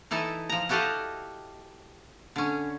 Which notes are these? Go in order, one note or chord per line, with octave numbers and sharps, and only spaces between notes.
E3 D#4 E4 A4
F3 A#5
E4 F#4 G4 A4 D#5 F5
D3 C#4